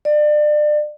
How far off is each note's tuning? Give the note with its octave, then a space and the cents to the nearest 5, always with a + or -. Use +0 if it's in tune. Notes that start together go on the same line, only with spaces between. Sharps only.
D5 +30